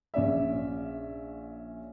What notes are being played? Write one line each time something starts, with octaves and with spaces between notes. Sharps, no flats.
A#1 C#4 D5 E5